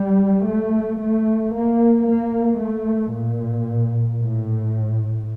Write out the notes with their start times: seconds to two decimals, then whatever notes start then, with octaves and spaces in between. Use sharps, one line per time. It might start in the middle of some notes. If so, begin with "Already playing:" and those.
Already playing: G3
0.49 A3
1.02 A3
1.55 A#3
2.07 A#3
2.61 A3
3.14 A#2
4.20 A2